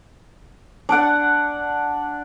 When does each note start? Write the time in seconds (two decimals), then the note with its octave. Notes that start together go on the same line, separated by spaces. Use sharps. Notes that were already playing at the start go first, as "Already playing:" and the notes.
0.89 D4 D5 F#5